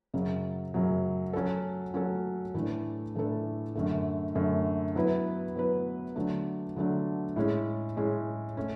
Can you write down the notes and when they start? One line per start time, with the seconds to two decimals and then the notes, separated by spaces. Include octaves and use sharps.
0.14 F#2 C#3 F#3
0.74 F#2 C#3 F#3
1.33 F#3 C#4 F#4 A4
1.94 F#3 C#4 F#4 A4
2.54 A2 E3 A3 D4 A4
3.15 A2 E3 A3 D4 A4
3.75 F#2 D3 A3
4.35 F#2 D3 A3
4.95 F#3 B3 E4 B4
5.55 F#3 B3 E4 B4
6.16 D3 F#3 A3 D4
6.76 D3 F#3 A3 D4
7.36 A2 G#3 C#4
7.97 A2 G#3 C#4
8.57 A3 C#4